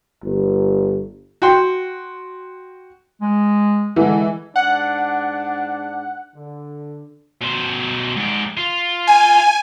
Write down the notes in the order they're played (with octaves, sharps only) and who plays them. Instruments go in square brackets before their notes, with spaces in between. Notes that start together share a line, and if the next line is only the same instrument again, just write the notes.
[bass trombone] G1
[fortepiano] F#4 G5 C6
[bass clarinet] G#3
[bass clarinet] D3 [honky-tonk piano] E3 G#3
[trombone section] G#2 D4 [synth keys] F#5
[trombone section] D3
[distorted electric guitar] B2 C5
G#2 G4
F4
[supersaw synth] G#5